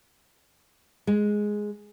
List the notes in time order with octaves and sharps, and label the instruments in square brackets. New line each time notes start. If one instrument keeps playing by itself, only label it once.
[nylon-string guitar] G#3